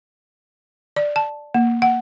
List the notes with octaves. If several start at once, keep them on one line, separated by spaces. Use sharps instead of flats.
D5
A5
A#3
F#5